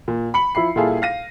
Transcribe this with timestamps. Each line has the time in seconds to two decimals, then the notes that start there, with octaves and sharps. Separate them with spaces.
0.08 A#2
0.34 B5 C#7 F#7
0.55 F3 E4 B5 C7
0.76 A#2 G3 E4 F4 G#4 A4
1.02 F5 A#6 D#7